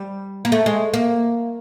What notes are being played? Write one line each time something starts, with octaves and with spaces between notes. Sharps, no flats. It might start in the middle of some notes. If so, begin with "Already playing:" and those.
Already playing: G3
A#3
A3
G#3
A#3